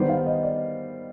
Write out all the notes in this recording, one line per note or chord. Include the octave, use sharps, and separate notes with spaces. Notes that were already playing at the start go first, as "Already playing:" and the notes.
Already playing: D#3 G3 B3 C5
F5
D#5
D5